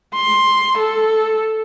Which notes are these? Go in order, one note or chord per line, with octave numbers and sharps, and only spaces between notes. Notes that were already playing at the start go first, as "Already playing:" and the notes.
C6
A4